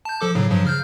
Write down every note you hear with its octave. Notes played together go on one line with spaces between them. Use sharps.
A5 G6
F3 A4 D6
A2 C#3 F#3
G2 F3 F#3
C#3 F6 G6